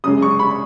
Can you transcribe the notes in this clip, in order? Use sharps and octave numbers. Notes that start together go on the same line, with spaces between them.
F#2 C#3 G#3 D#6
C#6
B5